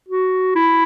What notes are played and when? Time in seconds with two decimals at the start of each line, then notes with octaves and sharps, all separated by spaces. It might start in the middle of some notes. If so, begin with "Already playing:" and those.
0.08 F#4
0.55 E4